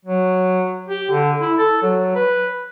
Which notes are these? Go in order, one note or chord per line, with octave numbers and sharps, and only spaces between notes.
F#3
G4
D3
E4
A4
F#3
B4